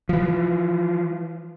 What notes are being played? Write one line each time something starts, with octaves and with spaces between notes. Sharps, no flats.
E3 F3